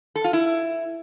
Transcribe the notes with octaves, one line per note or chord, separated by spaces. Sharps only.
A4
F4
E4